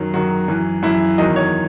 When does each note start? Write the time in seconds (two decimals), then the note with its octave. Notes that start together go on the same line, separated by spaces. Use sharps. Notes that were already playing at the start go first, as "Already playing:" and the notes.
Already playing: F#2 D#3 F#3
0.14 F#2 D#3 F#3 F#4
0.48 F#2 E3
0.83 F#2 E3 E4
1.18 E2 D#3 F#3 D#5
1.36 C#5